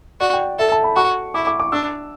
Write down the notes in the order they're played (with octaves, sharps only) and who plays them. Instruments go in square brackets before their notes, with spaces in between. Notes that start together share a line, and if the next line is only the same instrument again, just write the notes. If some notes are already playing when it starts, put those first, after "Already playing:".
[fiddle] F#4 [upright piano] D5
[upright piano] G5
[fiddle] A4 [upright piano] E5
[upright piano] A5
B5
[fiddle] F#4 [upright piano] C#6
[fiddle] E4 [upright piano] D6
[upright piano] D6
D6
[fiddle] D4 [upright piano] E6